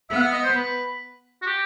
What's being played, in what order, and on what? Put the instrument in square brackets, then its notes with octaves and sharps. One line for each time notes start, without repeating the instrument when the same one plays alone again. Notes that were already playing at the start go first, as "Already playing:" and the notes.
[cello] B3 [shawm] E5
[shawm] F#5
E5
D#5
C5
B4
F#4
G4